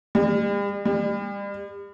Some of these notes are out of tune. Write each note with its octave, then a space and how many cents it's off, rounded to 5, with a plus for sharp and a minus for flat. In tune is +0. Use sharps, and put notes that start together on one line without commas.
G3 +45
G3 +40